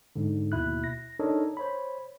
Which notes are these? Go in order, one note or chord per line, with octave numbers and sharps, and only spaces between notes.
G#2 D3
D#2 B2 E4 F#6
A#6
D4 D#4 A4 A#4 C#5 D#5
C5 C#5 B5